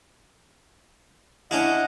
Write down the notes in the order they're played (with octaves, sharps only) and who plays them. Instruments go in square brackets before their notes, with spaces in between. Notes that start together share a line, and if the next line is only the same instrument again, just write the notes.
[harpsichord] C#4 D4 E4 [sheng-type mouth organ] D#5 F#5